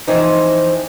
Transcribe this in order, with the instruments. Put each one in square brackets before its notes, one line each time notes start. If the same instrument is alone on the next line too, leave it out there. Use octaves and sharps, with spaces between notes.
[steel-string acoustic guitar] E3 F3 C4 D#4 E4